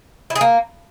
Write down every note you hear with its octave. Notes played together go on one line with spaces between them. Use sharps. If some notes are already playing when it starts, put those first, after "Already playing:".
E4
G#4
A#3